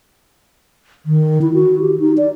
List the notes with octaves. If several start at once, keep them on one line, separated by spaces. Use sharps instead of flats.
D#3
E4
F#4
G4
D#4
D5